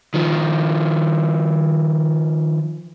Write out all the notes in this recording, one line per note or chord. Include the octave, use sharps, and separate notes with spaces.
D#3 F3